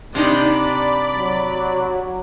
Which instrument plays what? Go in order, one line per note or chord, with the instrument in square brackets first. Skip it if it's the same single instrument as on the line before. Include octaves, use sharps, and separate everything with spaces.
[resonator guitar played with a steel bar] C3 D4 D#4 [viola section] D5 B5
[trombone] F#3